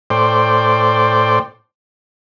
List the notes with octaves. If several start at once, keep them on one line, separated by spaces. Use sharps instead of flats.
A2 C5 D5 G5